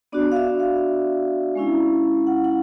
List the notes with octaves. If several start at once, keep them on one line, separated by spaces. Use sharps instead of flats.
B3 D4 F#4 D5
F5
E5
F5
G#3 C#4 E4
F#5
F#5